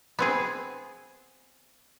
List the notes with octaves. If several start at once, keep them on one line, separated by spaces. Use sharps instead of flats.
B3 C4 G#4